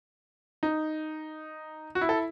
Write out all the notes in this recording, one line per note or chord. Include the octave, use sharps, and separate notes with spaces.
D#4
F#4
E4
A4